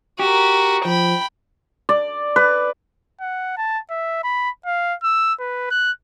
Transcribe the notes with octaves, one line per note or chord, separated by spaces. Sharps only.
F#4 G4 A#4
F3 G5 B5
D5
B4
F#5
A5
E5
B5
F5
E6
B4
F#6